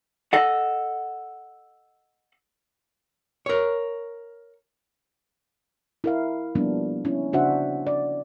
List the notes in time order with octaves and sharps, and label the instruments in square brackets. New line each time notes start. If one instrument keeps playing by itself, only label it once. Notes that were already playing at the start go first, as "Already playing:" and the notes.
[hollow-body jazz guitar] A4 D#5 F#5
A#4 C#5
[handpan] E4 A#4 F5
F3 G3 A#3 B3 D4
C#4 E4
C#3 D4 F#4 C5 E5 F#5
D5